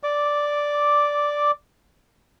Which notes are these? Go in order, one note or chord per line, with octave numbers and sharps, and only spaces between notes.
D5 D6